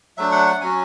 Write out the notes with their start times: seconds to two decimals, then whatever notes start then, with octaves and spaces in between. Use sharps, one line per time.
0.17 F#3 A3 D4 E5
0.32 F#5
0.47 F#5
0.61 F#3 C#4 F#4 G#5